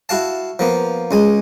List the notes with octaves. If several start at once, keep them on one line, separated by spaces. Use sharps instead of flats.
E4 F#4 F5 A5
F3 A#3 B3
C#2 G#3 G#5